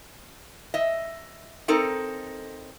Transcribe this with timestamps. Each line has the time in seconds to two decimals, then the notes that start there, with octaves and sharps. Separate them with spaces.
0.74 D#5 E5
1.68 C4 D#4 A4 A#4